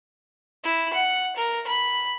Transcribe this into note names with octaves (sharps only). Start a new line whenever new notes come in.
E4
F#5
A#4
B5